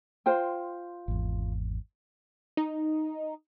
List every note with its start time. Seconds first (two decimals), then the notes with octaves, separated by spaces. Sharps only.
0.26 F4 C5 G5
1.08 G#1 E2
2.57 D#4